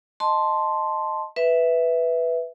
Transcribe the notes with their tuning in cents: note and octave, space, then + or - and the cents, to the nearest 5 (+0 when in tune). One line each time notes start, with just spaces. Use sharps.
D#5 +0 A5 +0 C6 +0
B4 +0 E5 +0